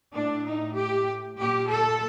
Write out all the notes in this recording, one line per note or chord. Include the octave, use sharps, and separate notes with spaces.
A2 D4
D#4
G4
A#2 G4
A4